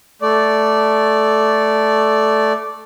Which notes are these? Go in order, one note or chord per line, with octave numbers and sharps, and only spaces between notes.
A3 D5